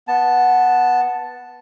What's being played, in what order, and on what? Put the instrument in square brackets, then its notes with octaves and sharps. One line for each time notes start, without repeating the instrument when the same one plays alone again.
[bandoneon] B3 A5